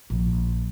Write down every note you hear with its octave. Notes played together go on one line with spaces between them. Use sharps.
A#1